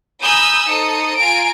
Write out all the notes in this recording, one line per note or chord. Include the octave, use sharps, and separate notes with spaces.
G#5 A#5 B5 D#6 E6 G6
D#4 A4 C5 D#6 C#7
F4 G#5 A#5 D7